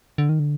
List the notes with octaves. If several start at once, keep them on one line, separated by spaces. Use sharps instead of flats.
D3
D#3
D3